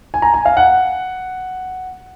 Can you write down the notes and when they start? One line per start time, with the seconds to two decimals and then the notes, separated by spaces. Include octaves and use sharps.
0.14 G#5
0.22 A#5
0.34 G#5
0.46 F5
0.57 F#5